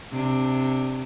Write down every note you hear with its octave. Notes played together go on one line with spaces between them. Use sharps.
C3 D4